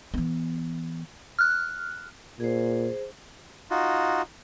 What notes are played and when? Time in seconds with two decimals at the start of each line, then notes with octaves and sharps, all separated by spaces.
0.14 E3 B3
1.39 F6 F#6
2.40 A#2 G#4 C5
3.70 D#4 F4 F#4